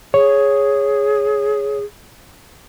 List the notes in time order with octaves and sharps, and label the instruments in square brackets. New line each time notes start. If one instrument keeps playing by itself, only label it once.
[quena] G#4 [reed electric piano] C#5